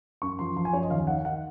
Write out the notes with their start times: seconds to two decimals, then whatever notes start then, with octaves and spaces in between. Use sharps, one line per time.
0.22 F#2 C#6
0.39 F3 C6
0.56 F3 C6
0.65 G#5
0.73 F#2 C#5
0.83 D#5
0.90 D#2 F5
1.07 D#3 F#5
1.25 D#3 F#5